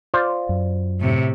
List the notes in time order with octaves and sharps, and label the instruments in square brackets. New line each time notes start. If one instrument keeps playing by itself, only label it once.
[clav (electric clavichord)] F4 C5 D5
[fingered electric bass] F#2
[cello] A2 C3